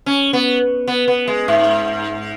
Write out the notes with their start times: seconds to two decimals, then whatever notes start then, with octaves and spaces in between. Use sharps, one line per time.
0.06 C#4
0.33 B3
0.88 B3
1.08 B3
1.28 G#3
1.48 G#2